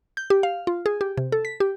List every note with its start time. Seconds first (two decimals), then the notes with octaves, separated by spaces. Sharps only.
0.17 G6
0.30 G4
0.43 F5
0.67 F4
0.86 G#4
1.01 G4
1.17 C3
1.32 A4
1.45 B6
1.60 G4